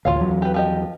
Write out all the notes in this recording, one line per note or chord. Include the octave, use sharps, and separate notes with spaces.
A1 D2 F4 C#5 F5
E2 F#3
G4 B4
F3 G4 D#5